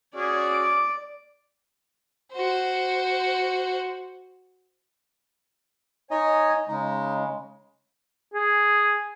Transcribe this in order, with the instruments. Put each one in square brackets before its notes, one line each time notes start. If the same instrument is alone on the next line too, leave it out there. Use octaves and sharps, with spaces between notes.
[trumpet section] C#4 F#4 G#4 [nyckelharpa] D5
[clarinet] D6
[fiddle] F#4 C5
[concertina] D#4 D#5 [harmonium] C#5 G#5
[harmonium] C#3 G#3 [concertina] D#4
[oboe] G#4